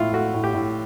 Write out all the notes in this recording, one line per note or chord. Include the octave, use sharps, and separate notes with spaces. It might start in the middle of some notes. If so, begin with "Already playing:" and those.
Already playing: A2 E4 F4
A3 F#4
A2
G4
A2